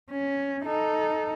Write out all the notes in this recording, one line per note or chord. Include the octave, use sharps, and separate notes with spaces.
C#4
D#4 A4